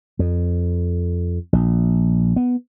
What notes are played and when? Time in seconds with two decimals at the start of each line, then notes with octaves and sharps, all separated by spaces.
0.19 F2
1.53 A#1
2.36 B3